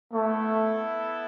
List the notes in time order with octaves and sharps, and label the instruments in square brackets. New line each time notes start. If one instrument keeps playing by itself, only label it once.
[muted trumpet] A3 [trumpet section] B3 E4 A4 E5